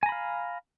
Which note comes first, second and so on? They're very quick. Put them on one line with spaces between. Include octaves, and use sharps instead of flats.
G#5 A#5 B5 F5